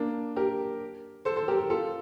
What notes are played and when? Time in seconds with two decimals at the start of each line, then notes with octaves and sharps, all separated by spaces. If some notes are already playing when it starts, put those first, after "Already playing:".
Already playing: A#3 D4
0.36 G4 A#4
1.25 A4 C5
1.36 A4 C5
1.48 G4 A#4
1.70 F4 A4